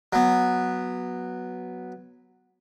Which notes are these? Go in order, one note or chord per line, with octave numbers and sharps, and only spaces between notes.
F#3 B3